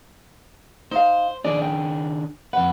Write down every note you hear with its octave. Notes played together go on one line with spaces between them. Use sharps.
D#4 C5 F5
D#3 D4 G#4 D5
G5
F2 B4 F#5